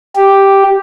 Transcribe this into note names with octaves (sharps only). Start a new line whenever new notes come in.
G4